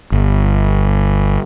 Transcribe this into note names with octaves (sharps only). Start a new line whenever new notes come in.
G1